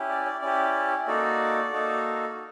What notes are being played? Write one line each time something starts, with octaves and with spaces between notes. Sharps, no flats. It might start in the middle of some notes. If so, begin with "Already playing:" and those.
Already playing: C#4 E4 G4
D5
D5
C#4 E4 G4 D5
A#3 D#4 F#4 A4 D5
A#3 D#4 F#4 A4